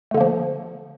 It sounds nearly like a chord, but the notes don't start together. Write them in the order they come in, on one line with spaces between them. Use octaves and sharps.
A3 D3 A#3 F3